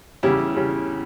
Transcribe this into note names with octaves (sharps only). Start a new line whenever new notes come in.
E2 C#3 G3 E4 G4
C#3 G3